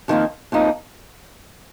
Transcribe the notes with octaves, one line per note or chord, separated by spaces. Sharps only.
F2 D#3 A#3 F4
F2 F3 A#3 D#4